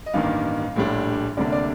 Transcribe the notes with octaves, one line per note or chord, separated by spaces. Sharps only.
D#5
A1 G2 D#3 A#3 F5
A#1 A2 G3 D4
D2 C3 G3 A#3 D4 D5
D5